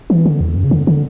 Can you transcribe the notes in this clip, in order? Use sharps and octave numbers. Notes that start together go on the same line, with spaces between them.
E3
D3
E2
F#2
C#3
D3
D3